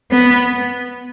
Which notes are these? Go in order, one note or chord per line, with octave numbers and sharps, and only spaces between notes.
B3